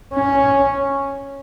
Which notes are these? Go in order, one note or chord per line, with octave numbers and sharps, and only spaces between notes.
C#4